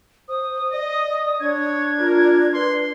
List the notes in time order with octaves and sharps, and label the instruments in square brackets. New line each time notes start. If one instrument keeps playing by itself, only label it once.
[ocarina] C5 [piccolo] D#6
[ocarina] D5 [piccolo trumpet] D#5
[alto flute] D4 [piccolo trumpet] C#5 [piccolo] G#6
[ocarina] F4 [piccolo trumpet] A#4
[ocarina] B4 [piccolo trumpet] C6